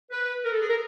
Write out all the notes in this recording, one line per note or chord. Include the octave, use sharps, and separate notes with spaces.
B4
A#4
A4
G#4
A#4